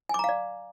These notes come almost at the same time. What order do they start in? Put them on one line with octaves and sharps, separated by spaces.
G#5 D6 A#5 F5 D5